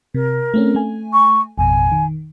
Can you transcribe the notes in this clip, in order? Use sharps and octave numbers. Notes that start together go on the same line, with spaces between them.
C3 A#4
A3 C4 C#4
A3 G#5
C#6
A1 F2 B2 G#5
D#3